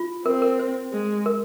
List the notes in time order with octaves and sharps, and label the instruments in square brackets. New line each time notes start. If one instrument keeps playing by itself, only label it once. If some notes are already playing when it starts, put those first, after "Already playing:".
Already playing: [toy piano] F4
[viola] C4 [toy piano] A#4
[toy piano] A#4
C5
[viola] G#3
[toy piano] A#4